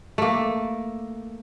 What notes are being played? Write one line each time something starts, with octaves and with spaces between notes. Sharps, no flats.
A3 A#3